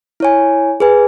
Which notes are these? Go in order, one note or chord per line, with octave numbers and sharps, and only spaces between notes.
E4 C#5 G#5
G#4 B4 G#5